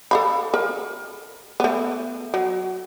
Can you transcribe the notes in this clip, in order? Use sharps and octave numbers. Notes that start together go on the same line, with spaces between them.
A4 F5 B5
A#4
A3 B3
F#3